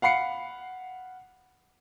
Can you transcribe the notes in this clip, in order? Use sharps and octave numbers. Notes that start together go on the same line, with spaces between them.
F5 F#5 B5 C7 C#7